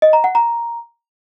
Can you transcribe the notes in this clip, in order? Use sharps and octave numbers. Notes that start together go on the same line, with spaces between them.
D#5
A#5
F#5
A#5